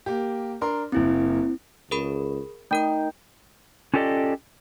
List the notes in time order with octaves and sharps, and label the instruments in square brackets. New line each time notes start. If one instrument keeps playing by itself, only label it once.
[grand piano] A#3 G4
D4 A#4 C6
[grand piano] F#1 A#3 [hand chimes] C4 E4
[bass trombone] C#2 [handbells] G#4 A#4 B5
[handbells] A3 A#4 G6 [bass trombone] D#4 [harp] G5
[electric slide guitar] C#4 F4 G4 A4 D5 D#5